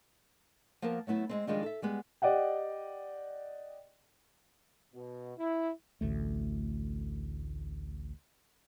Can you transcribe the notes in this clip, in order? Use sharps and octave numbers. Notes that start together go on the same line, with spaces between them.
F3 A#3 B3 A#4 A5
F#3 A3 B3 E4
G#3 A3 C4
D#3 F3 G3 G#3 D4 D#4
A4 E5
G3 G#3 B3
G4 D5 D#5 F#5 G5
B2
E4
A1 D2 A3